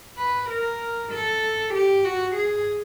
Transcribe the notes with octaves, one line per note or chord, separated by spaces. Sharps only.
B4
A#4
A4
G4
F#4
G#4